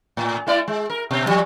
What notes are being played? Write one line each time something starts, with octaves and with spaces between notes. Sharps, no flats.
A2
A3 E4 D5
G#3
A#4
B2
F3 G3